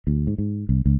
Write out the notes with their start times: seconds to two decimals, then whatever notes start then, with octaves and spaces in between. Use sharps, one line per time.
0.07 D2
0.27 G#2
0.38 G#2
0.69 C2
0.86 C#2